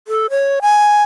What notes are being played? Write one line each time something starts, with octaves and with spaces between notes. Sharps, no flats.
A4
C#5
G#5